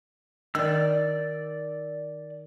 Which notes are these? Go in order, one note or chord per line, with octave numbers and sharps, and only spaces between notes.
D#3 D5 E6